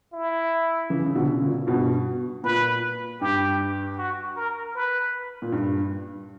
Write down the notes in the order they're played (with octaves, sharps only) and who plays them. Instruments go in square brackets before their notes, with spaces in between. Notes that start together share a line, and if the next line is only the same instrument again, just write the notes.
[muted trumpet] E4
[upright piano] C#3 E3
C#3
B2 D3
A#2 C#3
G2 B2
[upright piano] A#2 [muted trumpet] B4
[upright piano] G2 [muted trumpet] G4
[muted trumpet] F#4
A#4
B4
[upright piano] A#2
G2